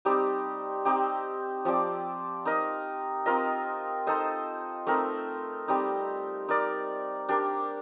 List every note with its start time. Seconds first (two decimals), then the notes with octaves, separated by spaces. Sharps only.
0.05 G3 C4 D#4 G4
0.85 C4 D#4 G4
1.65 F3 C4 G4 D5
2.45 D#4 A#4 D#5
3.26 C4 F4 A#4 D#5
4.07 D#4 A4 C5 D#5
4.87 A3 C4 D#4 A#4
5.68 G3 C4 D#4
6.48 D#4 A#4 D5
7.29 D4 G4 A#4